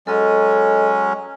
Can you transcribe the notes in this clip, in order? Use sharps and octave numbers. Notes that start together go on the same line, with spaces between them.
F#3 G#3 C#4 A4 D#5